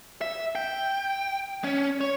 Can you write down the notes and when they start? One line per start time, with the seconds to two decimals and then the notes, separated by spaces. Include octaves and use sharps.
0.21 E5
0.55 G5
1.64 C#4
2.01 C#5